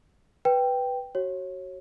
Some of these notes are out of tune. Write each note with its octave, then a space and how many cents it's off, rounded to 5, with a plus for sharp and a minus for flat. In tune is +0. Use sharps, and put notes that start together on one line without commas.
B4 +0 G5 +0
F#4 +20 C#5 -25